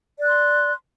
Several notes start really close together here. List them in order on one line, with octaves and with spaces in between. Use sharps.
D5 F#6 C6